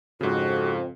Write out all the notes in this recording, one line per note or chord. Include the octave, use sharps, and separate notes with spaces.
F2 G#2 C#3 F#4